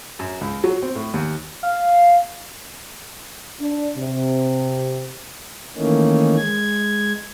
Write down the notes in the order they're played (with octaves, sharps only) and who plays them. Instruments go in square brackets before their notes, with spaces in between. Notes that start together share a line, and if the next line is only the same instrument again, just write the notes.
[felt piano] F#2
C#2
F#3
C4
A2
D#2
[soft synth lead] F5
[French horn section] D4
C3
[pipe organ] D#3 E3 A3 A#3 C#4 D#4
G#3 G#6